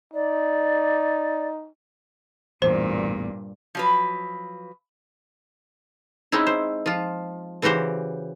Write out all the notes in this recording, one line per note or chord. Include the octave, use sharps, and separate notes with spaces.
D#4 D5
A1 E2 G2 A#2 C5
F3 F#3 B4
G#3 C4 C#4 D#4 E4
C5
F3 F4
C#3 E3 F#4 G4 C5